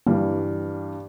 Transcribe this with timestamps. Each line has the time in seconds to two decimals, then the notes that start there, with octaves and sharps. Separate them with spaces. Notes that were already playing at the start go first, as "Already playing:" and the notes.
0.07 G2 E3 G3 A#3